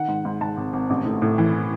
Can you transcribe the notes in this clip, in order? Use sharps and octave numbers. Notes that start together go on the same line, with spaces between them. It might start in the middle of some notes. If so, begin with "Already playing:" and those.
Already playing: D#3 F#5
G#2
G#2
G#2 A5
G#1
G#1
A1
A2
A2
E3